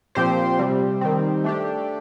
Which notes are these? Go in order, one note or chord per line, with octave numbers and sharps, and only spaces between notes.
A#2 F3 C4 G4 C5
C3 G3 C4
D#3 G3 C4
A3 D4 G4